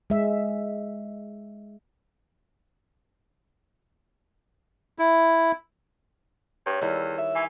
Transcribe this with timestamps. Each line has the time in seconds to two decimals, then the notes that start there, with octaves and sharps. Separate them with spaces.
0.10 G#3 E5
4.99 E4
6.66 G2 C#5
6.81 E2 D#3 G3 E4
7.18 E5
7.35 E3 G#5